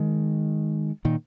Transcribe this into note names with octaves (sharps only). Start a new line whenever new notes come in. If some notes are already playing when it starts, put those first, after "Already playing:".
Already playing: D#3 G#3
A#2 D#3